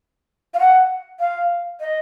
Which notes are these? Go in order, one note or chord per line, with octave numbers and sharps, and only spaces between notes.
F5
F#5
F5
D#5